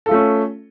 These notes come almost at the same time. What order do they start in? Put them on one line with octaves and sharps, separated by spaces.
A4 F4 A3 C#4